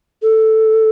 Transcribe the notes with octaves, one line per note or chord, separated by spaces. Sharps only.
A4